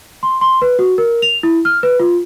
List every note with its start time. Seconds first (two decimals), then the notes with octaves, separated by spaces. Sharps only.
0.23 C6
0.41 C6
0.62 B4
0.79 F#4
0.98 A#4
1.22 F7
1.43 E4
1.65 F6
1.83 B4
2.00 F4